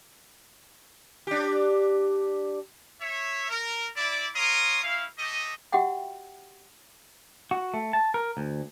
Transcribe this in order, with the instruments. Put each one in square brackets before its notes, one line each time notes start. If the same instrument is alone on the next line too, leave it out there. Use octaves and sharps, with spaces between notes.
[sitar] D4 G4
[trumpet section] C#5 E5
A#4
E4 D5
A#4 C#5 F5 C6 D#6
C#4 E4 F5
A3 G4 D#5
[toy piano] F#4 G4 E5 F#5 G5
[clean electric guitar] F#4
A3
A5
A#4
D2